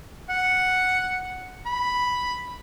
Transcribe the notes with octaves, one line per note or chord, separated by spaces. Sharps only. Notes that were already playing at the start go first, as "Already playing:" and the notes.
F#5
B5